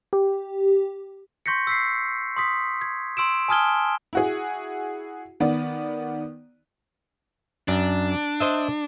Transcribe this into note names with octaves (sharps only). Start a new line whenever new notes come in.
G4
C6 C#6 G6 A#6 B6 C#7
E6 B6 C7
C6 D#6 B6
G#6
C6 E6 D7 E7
G#5 A5 D#6 F6 G#6 G7
E4 F#4 G#4
D#3 B3 D5
F#2 D4
C5 D#5 E5